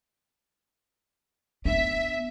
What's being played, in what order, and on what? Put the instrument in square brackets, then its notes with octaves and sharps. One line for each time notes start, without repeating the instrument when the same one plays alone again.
[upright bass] B3 D4 [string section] E5